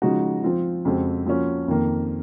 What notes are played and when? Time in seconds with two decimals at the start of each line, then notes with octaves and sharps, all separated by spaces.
0.02 C#3 F3 G#3 D#4 F#4
0.43 F3 C4 F4
0.85 F2 C#3 G#3 C4 F#4
1.26 F3 A#3 C#4 F#4
1.68 F2 D#3 A#3